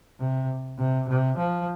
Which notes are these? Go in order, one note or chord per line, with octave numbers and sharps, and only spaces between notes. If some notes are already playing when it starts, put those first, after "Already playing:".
C3
C3
C3
F3